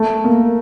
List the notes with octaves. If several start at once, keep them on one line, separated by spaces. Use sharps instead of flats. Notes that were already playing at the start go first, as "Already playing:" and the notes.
Already playing: A3
A#3